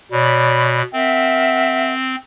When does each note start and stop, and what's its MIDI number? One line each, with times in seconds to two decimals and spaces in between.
0.12 0.82 47
0.12 0.81 73
0.12 0.81 74
0.12 0.81 83
0.93 2.16 60
0.93 1.93 70
0.93 1.93 76
0.93 1.93 78